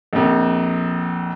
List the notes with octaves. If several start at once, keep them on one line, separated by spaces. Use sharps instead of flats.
A#1 F2